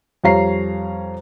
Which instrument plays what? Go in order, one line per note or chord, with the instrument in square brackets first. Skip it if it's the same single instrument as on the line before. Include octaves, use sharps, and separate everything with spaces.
[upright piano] F2 G3 C#5 F5 A#5 C7